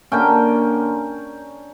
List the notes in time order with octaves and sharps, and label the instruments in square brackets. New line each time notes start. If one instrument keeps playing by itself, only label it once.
[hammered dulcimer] D3 A#3 C#4 G5